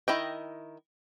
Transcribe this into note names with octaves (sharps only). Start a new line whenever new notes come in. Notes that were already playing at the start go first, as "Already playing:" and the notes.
D#3 E4 D#5 G5